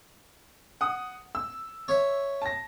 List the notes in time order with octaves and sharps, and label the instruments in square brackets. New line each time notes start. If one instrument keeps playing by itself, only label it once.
[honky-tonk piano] F#5 D#6
E6
[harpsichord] C#5 E5
[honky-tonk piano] A5 A#6